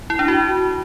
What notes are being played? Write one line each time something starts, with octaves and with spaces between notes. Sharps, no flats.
E4
D4
F#4